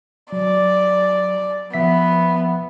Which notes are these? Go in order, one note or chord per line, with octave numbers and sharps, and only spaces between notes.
F#3 D5
F3 B3 E5 B6